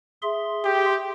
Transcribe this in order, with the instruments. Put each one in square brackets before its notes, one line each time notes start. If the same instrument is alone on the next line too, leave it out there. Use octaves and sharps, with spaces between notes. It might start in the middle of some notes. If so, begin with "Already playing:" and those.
[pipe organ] G#4 E5 C6
[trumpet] G4